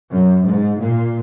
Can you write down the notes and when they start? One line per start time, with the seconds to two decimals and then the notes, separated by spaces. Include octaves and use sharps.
0.10 F#2
0.44 G#2
0.79 A#2